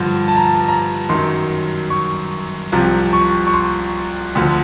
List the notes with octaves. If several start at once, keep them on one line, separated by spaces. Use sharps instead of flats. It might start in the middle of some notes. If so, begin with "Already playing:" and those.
Already playing: G2 D3 F3
A5
A#5
A5
A#5
F#2 D#3 F#3 C6
C#6
C2 C3 F3
C#6
C#6
C6
D2 D3 F3